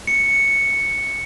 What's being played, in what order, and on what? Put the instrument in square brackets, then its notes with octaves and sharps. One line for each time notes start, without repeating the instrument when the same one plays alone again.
[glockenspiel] C#7